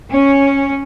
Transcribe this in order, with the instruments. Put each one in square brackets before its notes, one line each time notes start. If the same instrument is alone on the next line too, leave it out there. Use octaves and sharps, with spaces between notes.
[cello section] C#4